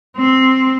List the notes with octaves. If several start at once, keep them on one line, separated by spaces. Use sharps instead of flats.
C4